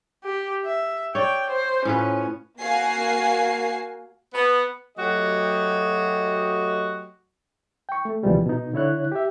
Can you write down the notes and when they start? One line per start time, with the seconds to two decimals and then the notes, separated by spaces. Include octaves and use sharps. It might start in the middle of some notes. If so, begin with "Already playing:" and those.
0.24 G4
0.65 E5
1.15 C#5 D5 G5
1.50 C5
1.85 A2 C#4 F4 B4
2.61 A#3 F#4 F5 G#5 C7
4.34 B3
4.98 F#3 A3 F#4 G4 D#5
7.89 G5 C#6
8.05 A3
8.23 C#2 B2 E3 F3 G3 G#3
8.46 B2 D#4
8.73 D3 E4 C#5 F#6
9.12 G4 E5